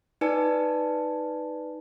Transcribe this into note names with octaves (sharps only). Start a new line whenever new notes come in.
D#4 B4 D5 G#5 A5